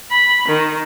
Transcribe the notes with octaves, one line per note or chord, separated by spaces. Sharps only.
B5
D#3